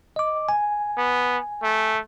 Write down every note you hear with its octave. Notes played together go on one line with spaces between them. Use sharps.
D#5 D6
G#5
B3
A3